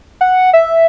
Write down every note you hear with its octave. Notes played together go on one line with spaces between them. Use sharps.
F#5
E5